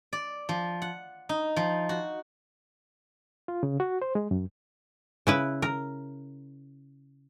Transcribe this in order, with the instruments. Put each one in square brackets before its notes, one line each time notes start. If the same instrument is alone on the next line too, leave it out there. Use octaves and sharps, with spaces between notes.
[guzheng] D5
F3
F#5
D#4
F3
F#4
[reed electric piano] F4
C#3
F#4
C5
G#3
F#2
[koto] C#3 E4 B4
A#4